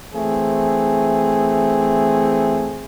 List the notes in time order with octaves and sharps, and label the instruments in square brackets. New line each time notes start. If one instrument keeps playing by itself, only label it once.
[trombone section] E3 A3 C4 G#4